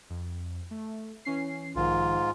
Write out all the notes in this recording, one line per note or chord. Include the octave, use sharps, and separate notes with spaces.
F2
A3
E3 C#4 C7
B1 G#2 D#3 F3 F4